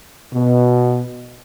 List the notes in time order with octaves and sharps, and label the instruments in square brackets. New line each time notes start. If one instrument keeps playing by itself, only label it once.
[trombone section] B2